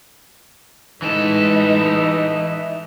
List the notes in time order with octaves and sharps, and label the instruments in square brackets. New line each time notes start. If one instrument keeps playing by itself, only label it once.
[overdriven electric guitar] E3 A4 [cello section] G#3 B4 [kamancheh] D#4 [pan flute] D#5